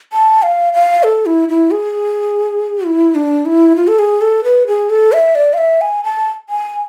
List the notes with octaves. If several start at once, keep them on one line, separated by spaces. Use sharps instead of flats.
A5
F5
F5
A4
E4
E4
G#4
E4
D4
E4
F4
A4
G#4
A4
B4
G#4
A4
E5
D5
F5
E5
G#5
A5
G#5